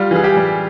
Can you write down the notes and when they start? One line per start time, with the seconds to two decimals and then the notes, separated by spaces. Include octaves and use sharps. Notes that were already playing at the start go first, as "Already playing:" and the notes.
Already playing: G3 F4
0.11 E3 G#4
0.24 G4
0.37 G3